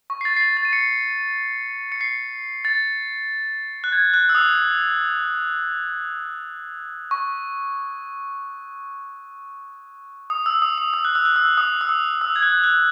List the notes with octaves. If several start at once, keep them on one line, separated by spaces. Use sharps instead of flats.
C#6
C7
A6
C7
A6
A6
D#7
C#7
C#7
C7
A6
F#6
G#6
F#6
E6
D#6
C#6
D#6
E6
D#6
D#6
E6
F#6
E6
F#6
E6
D#6
E6
D#6
E6
G#6
F#6
F#6